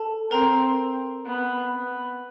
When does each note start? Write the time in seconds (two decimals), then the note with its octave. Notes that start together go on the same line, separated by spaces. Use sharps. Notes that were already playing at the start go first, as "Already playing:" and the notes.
Already playing: A4 A5
0.31 C4 A#4 A#5
1.26 B3
1.74 B3